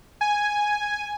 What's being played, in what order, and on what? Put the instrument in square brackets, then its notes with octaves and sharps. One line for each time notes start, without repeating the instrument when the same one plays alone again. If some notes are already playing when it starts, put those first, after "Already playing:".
[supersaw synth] G#5